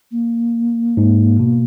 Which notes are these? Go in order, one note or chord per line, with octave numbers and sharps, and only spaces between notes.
A#3
G#2
B2